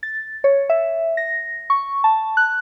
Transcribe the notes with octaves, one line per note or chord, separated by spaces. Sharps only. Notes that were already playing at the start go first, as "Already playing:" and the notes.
A6
C#5
E5
A#6
C#6
A5
F#6